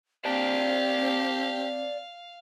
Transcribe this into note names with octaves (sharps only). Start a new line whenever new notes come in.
C4 G4 C5 D5 F5 A5